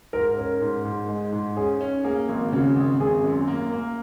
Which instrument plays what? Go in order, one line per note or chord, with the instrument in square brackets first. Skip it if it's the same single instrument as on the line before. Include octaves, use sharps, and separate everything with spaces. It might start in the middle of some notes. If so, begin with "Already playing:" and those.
[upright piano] G#2 [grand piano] A#4
[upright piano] C#4 [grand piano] A#4
[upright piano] G#2
G#2
G#3
G#2
[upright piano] C#4 [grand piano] G#4
[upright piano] C#4
[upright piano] A#3 [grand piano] G#4
[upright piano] G#1
[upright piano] C#3 [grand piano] F#4
[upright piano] G#1
[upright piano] G#1 [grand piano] G#4
[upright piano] F#2
A#3
A#3